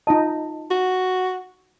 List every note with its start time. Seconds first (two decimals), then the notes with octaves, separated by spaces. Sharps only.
0.07 D#4 F4 D#5 A5
0.71 F#4